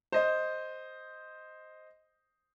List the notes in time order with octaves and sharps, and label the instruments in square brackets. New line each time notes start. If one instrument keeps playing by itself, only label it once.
[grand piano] C5 D#5